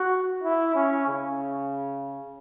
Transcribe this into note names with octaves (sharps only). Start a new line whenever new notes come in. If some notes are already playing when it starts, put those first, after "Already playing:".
Already playing: F#4
E4
C#4
C#3